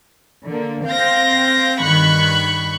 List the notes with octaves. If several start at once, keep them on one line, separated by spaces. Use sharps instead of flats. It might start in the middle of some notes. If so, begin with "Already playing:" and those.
D3 A#3
C4 F5 G6 A#6
G2 D#3 B5 C#6 F#6